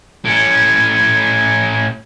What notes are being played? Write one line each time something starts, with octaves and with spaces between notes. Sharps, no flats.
A2 C#4